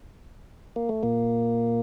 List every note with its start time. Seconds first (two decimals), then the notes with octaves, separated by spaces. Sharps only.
0.76 A#3
0.89 A3
1.03 A#2 A#3